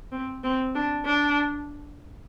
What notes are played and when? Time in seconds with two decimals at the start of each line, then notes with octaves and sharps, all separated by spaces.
0.12 C4
0.44 C4
0.75 D4
1.05 D4